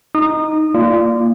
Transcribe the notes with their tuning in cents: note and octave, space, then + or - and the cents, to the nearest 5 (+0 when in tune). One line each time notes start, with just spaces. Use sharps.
D#4 +0 D#6 -30
A#3 -5 F4 -30 D5 +0